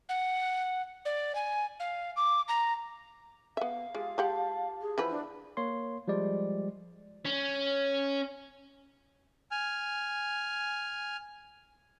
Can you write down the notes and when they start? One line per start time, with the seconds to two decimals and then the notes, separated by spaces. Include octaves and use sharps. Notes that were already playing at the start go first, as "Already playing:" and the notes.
0.09 F#5
1.05 D5
1.35 G#5
1.80 F5
2.17 D6
2.48 A#5
3.57 B3 E5 F5
3.95 G#3 F4 G4 G#4
4.18 G#3 G4 F#5 A5
4.81 G#4
4.98 E3 F3 B3 E4 B4
5.09 D4
5.57 A#3 C#5 C6
6.08 F3 G3 G#3 D5
7.26 C#4
9.51 G#5 F6